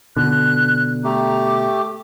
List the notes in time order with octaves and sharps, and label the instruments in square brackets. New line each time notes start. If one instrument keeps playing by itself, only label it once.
[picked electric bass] B2 D3 [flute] F#6
[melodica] A3 G4 [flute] A#5
[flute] D6